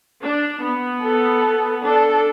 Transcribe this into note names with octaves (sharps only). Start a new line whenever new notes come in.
D4
B3
A4
D4 A4